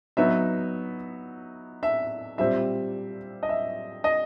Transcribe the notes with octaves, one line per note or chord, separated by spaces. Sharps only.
F#3 B3 D#4 E5
E5
A#2 G3 C4 E5
D#5
E5
D#5